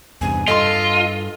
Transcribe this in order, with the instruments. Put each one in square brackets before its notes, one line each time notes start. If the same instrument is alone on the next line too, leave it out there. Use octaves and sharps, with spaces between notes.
[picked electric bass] E2 G2 C3 [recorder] G#5
[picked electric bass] G2 [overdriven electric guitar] F4 [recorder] A4 [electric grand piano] D#5 C6